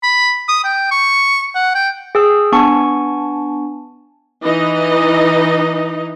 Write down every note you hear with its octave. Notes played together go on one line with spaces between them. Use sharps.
B5
D#6
G5
C#6
F#5
G5
G#4 G5 E6
B3 D4 G#5 A5 C#6
E3 D#4 D#5